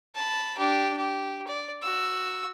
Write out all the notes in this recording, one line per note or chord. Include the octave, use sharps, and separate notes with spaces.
A5 B5
D4 G4
G4
D5
F#4 E6